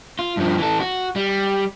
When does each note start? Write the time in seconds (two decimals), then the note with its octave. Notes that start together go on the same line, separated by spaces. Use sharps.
0.19 F4
0.37 G2 F3
0.58 E3 A4
0.80 F#4
1.16 G3